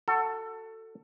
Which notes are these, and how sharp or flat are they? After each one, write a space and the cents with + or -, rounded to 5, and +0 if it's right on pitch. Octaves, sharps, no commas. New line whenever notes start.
F#4 +0 A4 +20